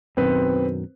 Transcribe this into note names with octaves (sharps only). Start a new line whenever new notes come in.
F#2 B2 D#3 C4 B4 C5